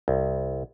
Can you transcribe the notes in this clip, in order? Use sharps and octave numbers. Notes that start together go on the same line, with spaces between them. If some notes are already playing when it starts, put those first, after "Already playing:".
C2